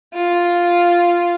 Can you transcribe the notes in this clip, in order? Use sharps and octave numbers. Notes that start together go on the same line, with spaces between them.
F4